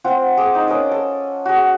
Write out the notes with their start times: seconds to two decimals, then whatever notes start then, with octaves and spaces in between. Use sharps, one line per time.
0.04 C4 F4 F#5
0.37 G#4 D6
0.55 D#4
0.66 C#4 A#4 D#5 D6
0.91 A4
1.46 F#4 G#4